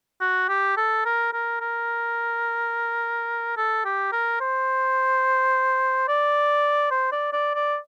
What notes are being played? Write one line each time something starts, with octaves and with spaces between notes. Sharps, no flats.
F#4
G4
A4
A#4
A#4
A#4
A4
G4
A#4
C5
D5
C5
D5
D5
D5